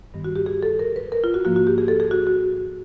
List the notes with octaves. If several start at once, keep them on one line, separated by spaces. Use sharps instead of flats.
G2 D#3 G3 B3
F#4
G4
G#4
A4
A#4
B4
A#4
F4
F#4
G#2 F3 A#3 F#4
F#4
G4
G#4
A4
G#4
F#4
F#4